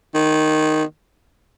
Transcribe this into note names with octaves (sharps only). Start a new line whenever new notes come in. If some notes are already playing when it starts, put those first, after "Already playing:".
D#3